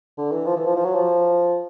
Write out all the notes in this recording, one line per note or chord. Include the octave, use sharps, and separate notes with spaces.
D3
E3
F3
E3
F3
F3
F#3
F3